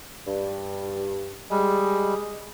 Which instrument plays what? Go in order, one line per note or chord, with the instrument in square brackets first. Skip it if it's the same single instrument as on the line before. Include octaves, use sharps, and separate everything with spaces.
[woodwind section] G2
[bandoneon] G3 [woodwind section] G#3